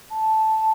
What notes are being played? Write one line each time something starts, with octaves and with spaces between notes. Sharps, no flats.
A5